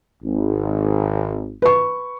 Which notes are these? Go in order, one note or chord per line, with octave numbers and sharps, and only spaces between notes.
G#1
B4 C#6